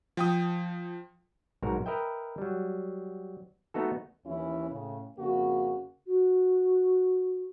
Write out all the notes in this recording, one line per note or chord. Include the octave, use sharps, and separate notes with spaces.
F3 G5 D#6
B1 G#2 F#4 A#4
A#4 B4 D#5 E5 G5
F#3 G3
A3 B3 D#4 F#4 A4
D#2 E3 C#4 E4
A2 C#3
F2 C#3 A#3 F#4
F#4